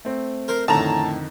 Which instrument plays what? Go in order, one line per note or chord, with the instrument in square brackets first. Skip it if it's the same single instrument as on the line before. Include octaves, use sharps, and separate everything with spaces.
[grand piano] A3 C4
[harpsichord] A#4 C5
[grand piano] F2 D3 D#3 [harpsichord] A2 [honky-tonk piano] A5 A#5